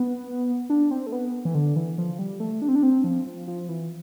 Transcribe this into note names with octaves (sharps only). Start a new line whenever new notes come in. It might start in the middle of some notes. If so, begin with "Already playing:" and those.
Already playing: B3
D4
C4
A3
B3
E3
D3
E3
F3
G3
A3
D4
C4
D4
C4
F3
F3
F3
E3